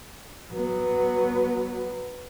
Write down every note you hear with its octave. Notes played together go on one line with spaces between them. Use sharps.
F#3 B3